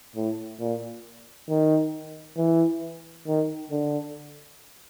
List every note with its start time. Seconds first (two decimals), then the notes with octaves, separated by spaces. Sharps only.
0.16 A2
0.60 A#2
1.49 D#3
2.37 E3
3.27 D#3
3.71 D3